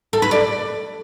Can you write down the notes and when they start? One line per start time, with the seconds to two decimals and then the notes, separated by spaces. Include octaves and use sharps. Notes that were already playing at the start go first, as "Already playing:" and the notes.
0.13 A4
0.22 B4
0.31 D5